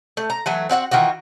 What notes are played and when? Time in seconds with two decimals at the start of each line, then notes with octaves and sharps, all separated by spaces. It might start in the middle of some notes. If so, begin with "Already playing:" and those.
0.17 A3
0.30 A#5
0.46 E3 F#3 A3
0.69 C4 F#4 E5 F#5
0.91 D#3 E3 F4 F#4